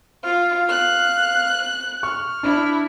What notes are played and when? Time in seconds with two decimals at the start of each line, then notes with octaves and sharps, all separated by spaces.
0.23 F4 F5
0.69 F#6
2.03 C#6 F6
2.43 D4 E4